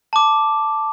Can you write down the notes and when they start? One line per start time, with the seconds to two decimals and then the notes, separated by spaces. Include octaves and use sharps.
0.13 A5 D6